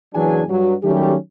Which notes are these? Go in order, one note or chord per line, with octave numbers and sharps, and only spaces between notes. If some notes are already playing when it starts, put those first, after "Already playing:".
F#1 E3 F#3 D4 G#4 G#5
G2 F#3
D#3 F#3 G3 A3 C#4 G4